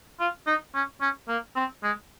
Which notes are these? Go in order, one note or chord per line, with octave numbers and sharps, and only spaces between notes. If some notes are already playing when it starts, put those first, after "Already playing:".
F4
D#4
C#4
C#4
A#3
C4
G#3